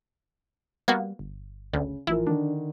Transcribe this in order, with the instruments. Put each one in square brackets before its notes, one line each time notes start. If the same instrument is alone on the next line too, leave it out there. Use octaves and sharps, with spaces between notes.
[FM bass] G3 [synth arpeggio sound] A#3 B3 F#4
[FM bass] G1
[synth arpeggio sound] D2 [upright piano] C#3
[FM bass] A1 [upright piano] E3 F3 A#4 [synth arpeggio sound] E4
[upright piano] D3 D#3 [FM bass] D4